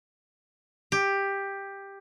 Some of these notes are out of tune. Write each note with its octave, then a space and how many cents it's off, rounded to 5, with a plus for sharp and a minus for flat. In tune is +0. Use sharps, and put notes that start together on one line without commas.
G4 +10